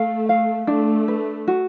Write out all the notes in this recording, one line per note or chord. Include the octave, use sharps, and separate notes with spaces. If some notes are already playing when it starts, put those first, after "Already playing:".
Already playing: A3 F5
F5
A3 D4
B4
F#4